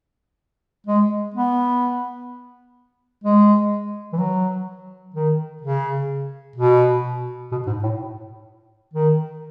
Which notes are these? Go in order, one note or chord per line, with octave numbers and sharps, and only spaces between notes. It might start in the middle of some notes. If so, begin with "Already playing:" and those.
G#3
B3
G#3
E3
F#3
D#3
C#3
B2
B2
G#2
A2
D#3